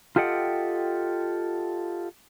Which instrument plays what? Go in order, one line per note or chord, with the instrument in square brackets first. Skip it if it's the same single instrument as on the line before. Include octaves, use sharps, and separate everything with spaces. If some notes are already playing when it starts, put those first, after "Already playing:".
[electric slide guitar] F4 G4 A4 D#5 F#5 G5